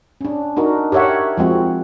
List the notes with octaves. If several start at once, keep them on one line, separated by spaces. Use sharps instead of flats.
C#4 D4
D4 D#4 F#4 A#4
G4 A#4 C#5 E5 F#5
F3 G#3 C4 F#4